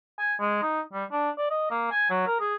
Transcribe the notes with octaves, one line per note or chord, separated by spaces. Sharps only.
G#5
G#3
D#4
G3
D4
D5
D#5
A#3
G#5
F#3
A#4
G#4